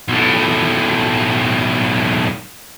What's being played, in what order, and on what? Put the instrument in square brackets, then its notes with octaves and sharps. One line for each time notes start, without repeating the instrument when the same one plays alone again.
[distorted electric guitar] B1 A2